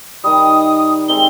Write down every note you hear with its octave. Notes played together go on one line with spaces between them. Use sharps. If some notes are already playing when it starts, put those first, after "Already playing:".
D#3 G3 D#6
G#3 C4 D#4 G7